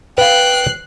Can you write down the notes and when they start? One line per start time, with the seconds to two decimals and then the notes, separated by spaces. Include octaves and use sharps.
0.18 B4 F5 G5 F#6 C7